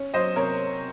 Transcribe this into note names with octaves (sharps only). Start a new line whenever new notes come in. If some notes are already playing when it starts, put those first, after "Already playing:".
Already playing: C#4
F#3 C5 D#5
C3 A#4 C#5